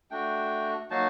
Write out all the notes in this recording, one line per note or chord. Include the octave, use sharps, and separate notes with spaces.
A3 D4 F#4 G5
F#3 A#3 D#4 F#4 A5